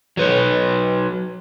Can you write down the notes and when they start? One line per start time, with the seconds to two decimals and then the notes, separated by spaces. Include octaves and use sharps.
0.17 F#3 B4 C#5